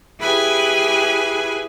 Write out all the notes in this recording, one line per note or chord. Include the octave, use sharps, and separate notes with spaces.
E4 G4 G#4 B4 G#5 B5